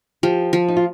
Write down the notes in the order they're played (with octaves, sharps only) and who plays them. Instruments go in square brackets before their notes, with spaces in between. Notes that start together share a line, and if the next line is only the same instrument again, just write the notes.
[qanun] F3 [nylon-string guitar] G4
[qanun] F3
[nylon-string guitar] D#4
F4